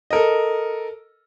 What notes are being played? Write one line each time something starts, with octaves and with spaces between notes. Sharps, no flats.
A4 A#4 D#5